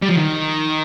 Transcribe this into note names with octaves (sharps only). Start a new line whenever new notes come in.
G3
F3
D#3